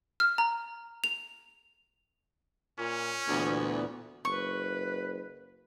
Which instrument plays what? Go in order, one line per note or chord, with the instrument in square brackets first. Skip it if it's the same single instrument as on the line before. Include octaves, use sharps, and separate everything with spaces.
[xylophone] F6
A#5
F7
[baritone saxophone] A#2 [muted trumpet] C#4
[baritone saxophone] D2 [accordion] A#2 E3 B3
[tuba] F#1 [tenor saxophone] B4 [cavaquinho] C#6